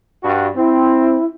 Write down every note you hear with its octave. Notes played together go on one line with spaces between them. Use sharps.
G2 F#4
C4 E4